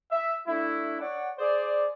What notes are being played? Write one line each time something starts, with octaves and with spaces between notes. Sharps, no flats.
E5
A3 D4 E4
C#5 D5 F#5
G#4 C5 D5